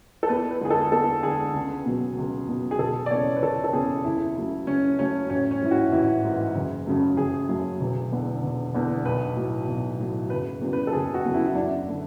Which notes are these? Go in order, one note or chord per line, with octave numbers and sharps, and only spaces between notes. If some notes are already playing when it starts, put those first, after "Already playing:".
A4
E2 B4
B4
D3 G#3 G#4
A4
E2 A4
D3 G#3 G#4
C#2
B2 F#3
C#2
B2 F#3
G#4
E1 A4
D5
E2 C#3 C#5
B4
E1 A4
A4
E2 C#3 G#4
C#2 E4
C#3 F#3 A3
C#2 C#4
C#3 F#3 A3 C#4
A1 C#4
C#4
G#2 E3 E4
F#4
A1 E4
G#2 E3
F#1
F#2 C#3 F#3 A3
F#1 G#4
F#2 C#3 F#3 A3
E1
E2 D3
E1
E2 D3
B1 B4
A2 F#3 A3
B1
A2 F#3 A3
F#1 B4
E2 C#3 F#3
B4
A4
F#1 G#4
F#4
E2 C#3 F#3
E4
E4
F#2 D4
D3 A3